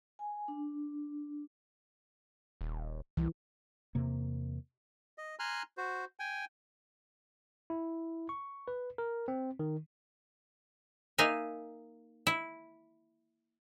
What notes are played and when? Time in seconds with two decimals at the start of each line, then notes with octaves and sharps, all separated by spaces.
0.19 G#5
0.48 D4
2.61 D#1
3.17 C2 E3
3.95 E2 C3 A#3
5.18 D#5
5.39 G#5 A#5 C6 F6 F#6
5.78 F#4 C5
6.20 G5 G#5
7.70 E4
8.29 C#6
8.68 B4
8.98 A#4
9.28 C4
9.59 D#3
11.18 A#3 D#4 E5 F5 G#5
12.27 E4